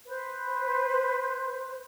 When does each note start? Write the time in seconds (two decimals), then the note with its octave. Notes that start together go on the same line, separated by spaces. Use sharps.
0.07 B4 C5